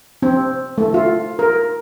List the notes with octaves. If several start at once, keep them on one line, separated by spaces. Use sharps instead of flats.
C4
A3
F4
A#4